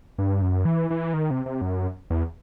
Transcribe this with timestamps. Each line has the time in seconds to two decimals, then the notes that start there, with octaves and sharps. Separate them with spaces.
0.18 G2
0.42 F#2
0.65 E3
0.90 E3
1.14 D#3
1.31 C3
1.46 C3
1.61 F#2
2.10 E2